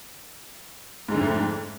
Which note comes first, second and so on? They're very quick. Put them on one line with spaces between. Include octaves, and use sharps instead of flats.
G#2 G#3 D3 F2 A3